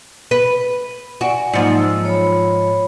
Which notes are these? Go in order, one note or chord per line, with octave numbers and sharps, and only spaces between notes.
B4
F#4 D5 G#5
G#2 F3 F#3 A#3 D#4
E6
C#5 B5